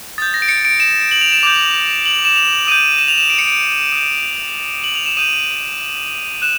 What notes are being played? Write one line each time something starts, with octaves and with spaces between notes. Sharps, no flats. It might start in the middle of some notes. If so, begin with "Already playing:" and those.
D#6 G6 A6
A#6
D7
C#7
D7
E7
F#7
F7
E7
D6 G6 F7
F#7
E7
F7
D#6 G6 D#7
E7
F7
E7
D7
C#7
D7
D#6 G6
F#7
F7
E7
D#6 G6 D#7
F#6 E7